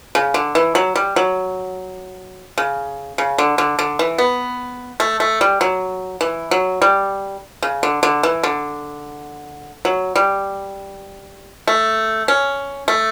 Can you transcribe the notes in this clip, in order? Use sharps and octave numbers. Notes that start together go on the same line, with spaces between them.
C#3
D3
E3
F#3
G3
F#3
C#3
C#3
D3
D3
D3
E3
B3
A3
A3
G3
F#3
E3
F#3
G3
C#3
D3
D3
E3
D3
F#3
G3
A3
C#4
A3